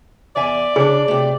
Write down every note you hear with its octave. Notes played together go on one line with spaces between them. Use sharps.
E2 D5 E5 G#5
C#3 D4 G#4
C3 A3